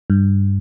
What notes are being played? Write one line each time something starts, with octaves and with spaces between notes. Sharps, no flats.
G2